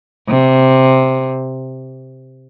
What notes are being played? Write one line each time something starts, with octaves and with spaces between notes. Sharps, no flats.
C3